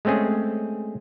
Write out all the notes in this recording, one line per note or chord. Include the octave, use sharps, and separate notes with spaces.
G#3 A3 C4 C#4 G#4